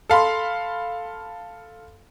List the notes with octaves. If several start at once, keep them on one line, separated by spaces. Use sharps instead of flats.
A4 F5 B5 C6